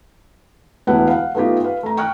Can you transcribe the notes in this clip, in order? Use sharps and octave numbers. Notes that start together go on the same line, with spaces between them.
E1 D2 B3 E4 G4 F#5
F5 F#5
A3 B3 D#4 F4 G4
B4 F5
A3 A#5
G5 C#6 F6 F#6